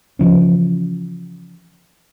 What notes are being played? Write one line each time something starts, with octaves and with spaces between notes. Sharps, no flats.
C#3 E3 F3 C#4